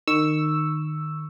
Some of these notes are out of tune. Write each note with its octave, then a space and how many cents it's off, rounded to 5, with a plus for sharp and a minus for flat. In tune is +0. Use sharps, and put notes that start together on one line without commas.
D#3 -25 C#6 +0 E6 +0